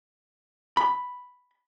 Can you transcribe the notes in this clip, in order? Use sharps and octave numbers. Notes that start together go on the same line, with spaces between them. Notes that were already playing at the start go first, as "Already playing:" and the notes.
B5